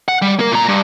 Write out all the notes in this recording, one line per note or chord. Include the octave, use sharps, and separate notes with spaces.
F#5
G3
A#3 A#4
A#2 A#5
G2